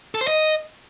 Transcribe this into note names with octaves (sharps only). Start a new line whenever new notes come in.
A4
C5
D#5